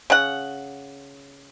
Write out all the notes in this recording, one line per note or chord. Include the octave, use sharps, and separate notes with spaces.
C#3 F#5